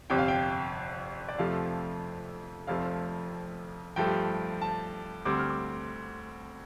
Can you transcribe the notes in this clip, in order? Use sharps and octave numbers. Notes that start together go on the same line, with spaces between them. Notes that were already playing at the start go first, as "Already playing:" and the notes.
G1 F2 C3 G5
F5
G5
D5
F2 C3 F3 A3 F5
F1 F2 F3 A3 F5
G2 F3 A3 G5
A5
D2 D3 G3 C4 D6
F6
D6